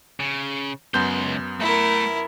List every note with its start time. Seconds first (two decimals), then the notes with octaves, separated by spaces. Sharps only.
0.20 C#3
0.94 C#2 F#2 B3 C6 G6
1.60 A3 E4 A#4